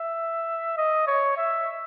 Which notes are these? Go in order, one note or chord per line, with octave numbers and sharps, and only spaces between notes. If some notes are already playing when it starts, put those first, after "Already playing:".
Already playing: E5
D#5
C#5
E5